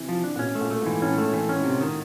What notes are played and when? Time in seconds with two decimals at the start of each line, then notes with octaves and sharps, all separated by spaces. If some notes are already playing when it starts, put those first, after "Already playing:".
Already playing: C3 E3
0.09 F3
0.24 D4
0.36 A#2
0.39 B2 C#4
0.55 A3
0.61 A#2
0.71 A3
0.81 G#2
0.86 E3
1.02 A2 C#4
1.18 A3
1.33 E3
1.49 C#4
1.64 C3
1.80 D#3